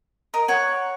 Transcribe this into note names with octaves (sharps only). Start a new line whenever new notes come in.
A#4 D#5
C#5 F#5